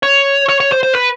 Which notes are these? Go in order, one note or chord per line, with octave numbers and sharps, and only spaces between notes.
C#5
C#5
C#5
C5
C5
B4